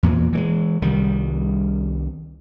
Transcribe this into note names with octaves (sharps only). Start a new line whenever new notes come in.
E2 A#2 E3
E3 F#3 G#3
C2 D#3 G3